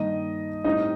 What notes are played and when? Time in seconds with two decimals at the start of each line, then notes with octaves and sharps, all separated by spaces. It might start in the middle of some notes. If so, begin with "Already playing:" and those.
Already playing: G2 D#3 A#3 D#4 D#5
0.64 A2 G3 C4 D#4 D#5